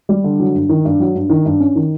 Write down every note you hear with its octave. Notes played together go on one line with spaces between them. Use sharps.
G3
D3
F#3
G2
D#3
G2
F#3
G2
D#3
G2
C#4
D#3